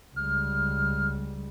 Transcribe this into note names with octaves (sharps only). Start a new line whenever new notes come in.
C#2 G3 F6